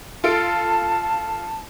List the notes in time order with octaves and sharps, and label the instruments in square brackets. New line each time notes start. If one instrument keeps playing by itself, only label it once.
[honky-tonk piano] F4 A4 D7 [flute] A5